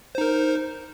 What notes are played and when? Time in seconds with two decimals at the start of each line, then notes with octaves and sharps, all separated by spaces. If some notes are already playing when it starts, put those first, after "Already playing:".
0.15 C5
0.18 D#4
0.21 A#4